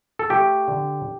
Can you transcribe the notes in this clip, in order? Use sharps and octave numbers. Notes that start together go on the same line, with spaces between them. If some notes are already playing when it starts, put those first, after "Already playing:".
A4
A3 G4
D3